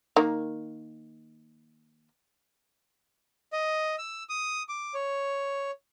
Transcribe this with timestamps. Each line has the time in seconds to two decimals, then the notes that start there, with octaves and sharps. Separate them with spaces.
0.16 D#3 A#3
3.53 D#5
3.99 E6
4.29 D#6
4.69 D6
4.94 C#5